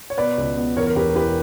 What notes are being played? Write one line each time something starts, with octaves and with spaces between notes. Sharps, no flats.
C#5
B2 B4 D5
C#2
B3
E2 A#4 C#5
A#4
E1 G4 B4
E3 G4 B4